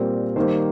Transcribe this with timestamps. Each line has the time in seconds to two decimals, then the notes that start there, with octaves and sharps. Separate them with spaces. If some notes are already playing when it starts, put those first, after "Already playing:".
Already playing: A#2 G3 C4 A#4
0.36 D#3 G3 A#3 C5